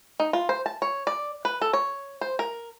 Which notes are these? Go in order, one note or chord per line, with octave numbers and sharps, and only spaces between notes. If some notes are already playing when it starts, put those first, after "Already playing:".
D#4
F4
C5
A5
C#5
D5
B4
A4
C#5
C5
A#4